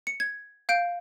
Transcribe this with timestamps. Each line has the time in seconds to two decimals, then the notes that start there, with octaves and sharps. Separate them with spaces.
0.07 C#7
0.20 G#6
0.69 F5 G6 D7